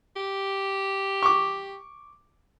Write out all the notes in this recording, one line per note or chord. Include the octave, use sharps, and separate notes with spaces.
G4
C#6 D6